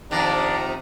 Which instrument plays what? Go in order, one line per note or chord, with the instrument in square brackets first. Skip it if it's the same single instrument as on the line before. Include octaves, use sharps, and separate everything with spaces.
[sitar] F2 D#3 [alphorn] C3 [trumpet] D4 [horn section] D5 G5 A#5